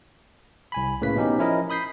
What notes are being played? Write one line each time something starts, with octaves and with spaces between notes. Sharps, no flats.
C2 G#5 B5
A2 C#3 A#3 B4 B6
B2 E3 C#4 D#4 G4
F3 C#4 E4 A#4 D#5
B5 D#6 G6 B6 C7